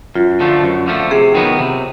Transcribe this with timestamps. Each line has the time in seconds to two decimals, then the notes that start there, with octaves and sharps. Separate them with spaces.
0.15 F#2 F4
0.40 D3 F3 A3
0.63 F#2
0.87 D3 F3 A3
1.11 C3 G#4
1.35 D#3 F#3 B3
1.59 C3